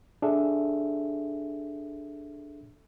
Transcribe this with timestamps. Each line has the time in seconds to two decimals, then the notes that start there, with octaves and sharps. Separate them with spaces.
0.22 D4 G#4 A4 E5